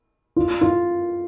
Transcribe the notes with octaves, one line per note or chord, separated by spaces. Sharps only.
F4
F4